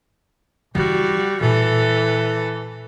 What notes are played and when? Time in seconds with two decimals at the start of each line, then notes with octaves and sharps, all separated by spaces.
0.75 E3 G3 E4 F#4
1.41 A#2 E3 A4